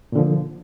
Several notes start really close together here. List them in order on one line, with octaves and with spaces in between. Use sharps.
A#2 D3 F3